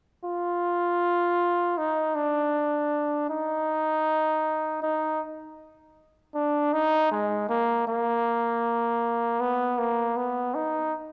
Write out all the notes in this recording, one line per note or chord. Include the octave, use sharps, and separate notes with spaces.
F4
D#4
D4
D#4
D#4
D4
D#4
G#3
A#3
A#3
B3
A#3
B3
D#4